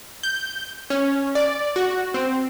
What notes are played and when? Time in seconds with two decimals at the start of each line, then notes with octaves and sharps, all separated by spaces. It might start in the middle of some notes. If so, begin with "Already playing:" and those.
0.23 G6
0.90 C#4
1.35 D5
1.76 F#4
2.14 C4